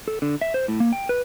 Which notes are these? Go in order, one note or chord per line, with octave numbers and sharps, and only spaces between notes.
A4
D3
E5
C5
A2
A#3
G5
B4